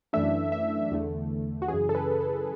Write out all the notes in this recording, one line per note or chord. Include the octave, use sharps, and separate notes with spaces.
F#2 E3 A3 D4 E5
E5
E2 D3 A3
F#4
F#2 C#3 E3 G#4
A4
B4
A4